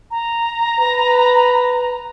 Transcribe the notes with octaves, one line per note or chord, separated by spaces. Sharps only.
A#5
B4